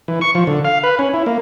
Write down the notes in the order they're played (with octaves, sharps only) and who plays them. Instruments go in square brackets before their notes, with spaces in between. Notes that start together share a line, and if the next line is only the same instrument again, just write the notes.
[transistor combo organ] E3
C#6
F3
D3
F5
B4
C#4
E4
A#3